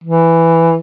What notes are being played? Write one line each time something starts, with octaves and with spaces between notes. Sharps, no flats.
E3